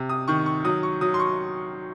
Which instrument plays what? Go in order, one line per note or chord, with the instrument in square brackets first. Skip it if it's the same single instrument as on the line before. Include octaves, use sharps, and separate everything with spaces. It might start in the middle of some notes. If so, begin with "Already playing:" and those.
Already playing: [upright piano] C3
D#6
D#3 C#6
C#6
F#3 D#6
C#6
F#3 D#6
C6
C#6